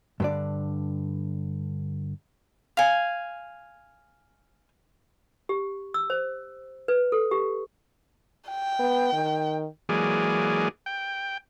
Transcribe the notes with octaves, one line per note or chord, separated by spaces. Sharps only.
G2 D3 D5
F5 G#5
G4
E6
C5
B4
A4
G4
G5
B3
D#3
E3 F#3 G#3 A#3 G#4 D5
G5